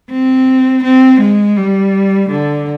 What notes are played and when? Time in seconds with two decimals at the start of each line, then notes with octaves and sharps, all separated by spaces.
0.11 C4
0.84 C4
1.21 G#3
1.57 G3
2.31 D3